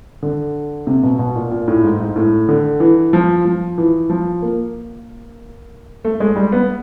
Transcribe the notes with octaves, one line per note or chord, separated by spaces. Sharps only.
D3
C3
B2
B2
A#2
A#2
A2
G#2
G#2
A2
D3
E3
F3
F3
E3
F3
A#3
A3
G#3
G3
B3